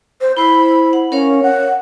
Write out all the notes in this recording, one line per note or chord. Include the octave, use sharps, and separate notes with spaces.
C5
E4 C5 B5
F#5
C#4 A#4 C#5 F5
F#5